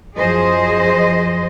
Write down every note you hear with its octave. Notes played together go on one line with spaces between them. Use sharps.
F#2 F3 G#4 C5 D#5